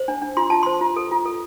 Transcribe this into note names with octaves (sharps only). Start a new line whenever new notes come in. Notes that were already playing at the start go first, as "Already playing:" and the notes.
Already playing: C5
D4
D4
F4 C6
F4 A5
C5 C6
F4
A4
F4
A4